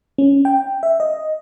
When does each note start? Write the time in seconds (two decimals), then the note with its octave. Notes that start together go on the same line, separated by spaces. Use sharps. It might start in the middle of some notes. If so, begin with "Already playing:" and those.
0.18 C#4
0.45 G5
0.83 E5
1.00 D#5